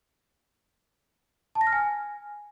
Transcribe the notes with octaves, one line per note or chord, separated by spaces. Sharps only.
A5
A#6
F6
G#5